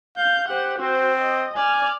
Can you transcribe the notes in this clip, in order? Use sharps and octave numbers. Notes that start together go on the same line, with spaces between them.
F5 G6
G4 C5 F#5
C4 F#4 C5
D#5
D5 G#5 F6